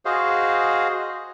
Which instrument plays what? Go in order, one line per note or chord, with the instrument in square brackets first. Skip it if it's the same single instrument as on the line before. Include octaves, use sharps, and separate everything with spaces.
[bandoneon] F#4 G#4 C5 D#5 F5